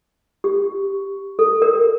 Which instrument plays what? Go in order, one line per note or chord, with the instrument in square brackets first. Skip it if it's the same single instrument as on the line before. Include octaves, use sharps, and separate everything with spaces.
[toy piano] G4
A4
A#4